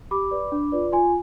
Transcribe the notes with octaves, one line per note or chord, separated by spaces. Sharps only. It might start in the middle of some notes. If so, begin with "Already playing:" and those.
G4 B5 D6
B4 D5
D4
F4 B4 D5
F4 G#5 C6